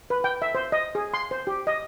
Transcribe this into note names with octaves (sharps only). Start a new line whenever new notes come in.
B4
G5
E5
C5
D#5
G#4
C6
C5
G4
D#5